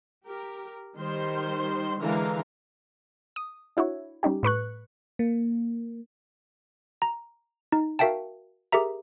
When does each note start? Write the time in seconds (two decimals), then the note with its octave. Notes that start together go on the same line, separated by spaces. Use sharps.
0.24 G4 A#4
0.97 D#3 G3 C5 C6
2.00 D3 E3 G#3 A#4 F5 A#5
3.36 D#6
3.77 D4 E4 F#4 C#5
4.23 G3 C#4 D#4 G4
4.43 A2 B4 C#6 F#6
5.19 A#3
7.02 A#5
7.72 D#4
7.99 F#4 A#4 E5 F5 G5 A5
8.72 G4 G#4 A#4 E5 A#5